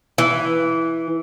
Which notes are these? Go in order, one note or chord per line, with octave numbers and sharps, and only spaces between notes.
E3